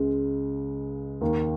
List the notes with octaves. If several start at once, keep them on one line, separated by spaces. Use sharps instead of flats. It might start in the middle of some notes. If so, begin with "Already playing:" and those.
Already playing: C#2 C#3 G#3
D#2 D#3 A#3